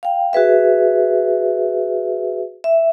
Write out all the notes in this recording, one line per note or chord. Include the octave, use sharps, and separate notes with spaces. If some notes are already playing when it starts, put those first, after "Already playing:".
F5 G5
F#4 G#4 B4 E5
E5